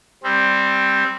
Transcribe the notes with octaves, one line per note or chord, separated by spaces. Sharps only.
G3 C4